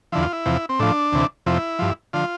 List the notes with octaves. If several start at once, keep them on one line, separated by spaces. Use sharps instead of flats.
E2 D3 F3 E4
F4
E4
E2 C3 F3
C4
A2 F3 D4
D2 C3 E3
F2 C3 F3 E4
G2 F3
D3 F3 F4